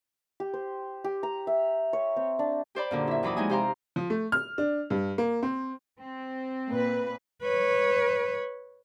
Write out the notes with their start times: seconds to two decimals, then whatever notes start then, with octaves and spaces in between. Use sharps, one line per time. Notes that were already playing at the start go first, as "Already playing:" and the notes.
0.40 G4
0.54 C5
1.04 G4
1.23 A#5
1.47 E5
1.93 C#5
2.16 C4
2.39 D4
2.75 G4 C5 D5 B5
2.91 F#2 A#2 D3
3.07 E4 E5
3.23 D#2 E3 F#3 B5 D6 D#6
3.36 F3 G#3 D#4 E4 G#5 D#6
3.49 C3 G4 C5 F5 A#5
3.96 F3
4.10 A3
4.32 F6
4.58 D4
4.90 G2
5.18 A#3
5.43 C4
6.00 C4
6.69 A#2 B4
7.43 B4 C#5